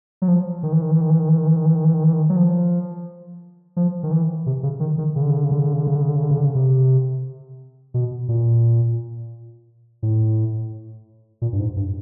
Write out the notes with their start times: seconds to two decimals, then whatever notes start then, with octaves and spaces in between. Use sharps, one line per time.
0.22 F#3
0.28 F3
0.63 D#3
0.72 E3
0.82 D#3
0.91 E3
1.01 D#3
1.10 E3
1.19 D#3
1.29 E3
1.38 D#3
1.47 E3
1.56 D#3
1.66 E3
1.75 D#3
1.84 E3
1.94 D#3
2.04 E3
2.13 D#3
2.30 F#3
2.37 F3
3.77 F3
4.03 D#3
4.11 E3
4.46 C3
4.63 C#3
4.80 D#3
4.98 D#3
5.16 C#3
5.22 D3
5.30 C#3
5.37 D3
5.44 C#3
5.51 D3
5.59 C#3
5.66 D3
5.73 C#3
5.80 D3
5.87 C#3
5.95 D3
6.01 C#3
6.09 D3
6.16 C#3
6.23 D3
6.31 C#3
6.38 D3
6.45 C#3
6.55 C3
7.94 B2
8.28 A#2
10.03 A2
11.42 A#2
11.53 G2
11.59 G#2
11.76 G2